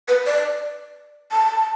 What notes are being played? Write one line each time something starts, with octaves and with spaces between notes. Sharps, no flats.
B4
D5
A5